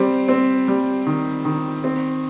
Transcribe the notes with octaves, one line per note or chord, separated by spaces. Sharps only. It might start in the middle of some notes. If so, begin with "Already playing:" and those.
Already playing: G3 C4
C4
G3
D#3
D#3
C4